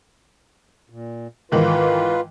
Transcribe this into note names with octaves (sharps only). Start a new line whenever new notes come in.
A#2
G#2 D#3 E3 F4 B4